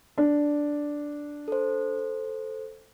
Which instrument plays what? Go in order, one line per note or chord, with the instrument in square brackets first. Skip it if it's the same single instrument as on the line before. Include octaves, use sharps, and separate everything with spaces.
[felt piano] D4
[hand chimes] A4 C5